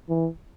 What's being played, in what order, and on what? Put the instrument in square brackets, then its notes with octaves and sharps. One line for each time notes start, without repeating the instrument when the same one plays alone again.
[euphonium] E3